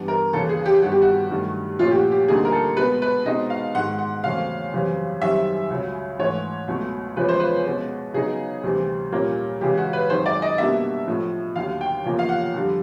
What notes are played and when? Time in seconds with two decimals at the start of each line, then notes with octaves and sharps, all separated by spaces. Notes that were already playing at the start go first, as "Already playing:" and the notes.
Already playing: G2 E3 G3 B3 D4
0.08 A#4
0.33 D#2 C#3 E3 A4
0.49 G#4
0.66 G4
0.82 G2 D#3 G3 B3 F#4
0.92 G4
1.02 F#4
1.31 G2 D#3 F#3 A3
1.79 A#2 F3 A3 C#4 F4
1.91 G4
1.96 F#4
2.12 G4
2.28 D2 D3 G3 A#3 D#4 G#4
2.45 A#4
2.52 A4
2.77 B2 G#3 B3 B4
3.02 B4
3.25 B2 G#3 C4 D#4 D#5
3.50 F5
3.75 G#2 D#3 G#3 F#5
3.99 F#5
4.23 E2 C#3 F#3 A3 C4 F5
4.73 F#2 C#3 E3 G3 C4
5.21 F#2 D#3 G3 C4 E5
5.70 C#2 C#3 F#3
6.19 G#2 E3 A3 C#5
6.68 C#2 B2 F#3 A3
7.16 E2 C#3 F3 G#3 C#4 B4
7.28 C5
7.40 B4
7.65 B2 G#3 C#4
8.14 C#3 F#3 B3 D#4 G#4
8.63 D2 C3 E3 G3 C4
9.12 A#2 G3 A#3 C#4
9.61 C#3 E3 G#3 G4
9.77 F#4
9.93 B4
10.10 F#2 D#3 G#3 C4 D#4 C5
10.26 D5
10.42 D#5
10.58 B2 G3 A#3 D4 E5
11.08 A2 F3 A3
11.56 D#2 D3 F#3 F5
11.81 G5
12.04 E2 C#3 F3 A#3
12.19 F5
12.29 F#5
12.54 F2 D3 G3